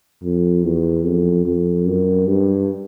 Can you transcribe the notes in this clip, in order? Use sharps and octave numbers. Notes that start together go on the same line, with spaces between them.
F2
E2
F2
F2
F#2
G2